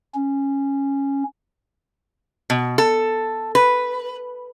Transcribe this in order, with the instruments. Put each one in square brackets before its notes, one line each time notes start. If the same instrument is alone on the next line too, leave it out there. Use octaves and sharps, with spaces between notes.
[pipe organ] C#4
[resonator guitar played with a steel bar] B2
A4
B4